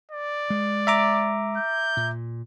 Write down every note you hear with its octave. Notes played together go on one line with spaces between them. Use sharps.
D5
G#3
E5 A#5 D6
G6
A#2